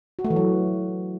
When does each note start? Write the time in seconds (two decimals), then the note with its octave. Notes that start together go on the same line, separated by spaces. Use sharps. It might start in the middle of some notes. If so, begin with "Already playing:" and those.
0.19 F#4
0.24 A3
0.30 E3
0.36 F#3